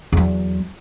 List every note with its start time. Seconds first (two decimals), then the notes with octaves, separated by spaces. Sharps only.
0.12 E2 F#3